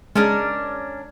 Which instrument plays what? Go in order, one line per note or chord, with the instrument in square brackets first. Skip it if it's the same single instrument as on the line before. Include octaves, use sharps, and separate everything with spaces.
[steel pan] G#3 [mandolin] C#4 D4 A#4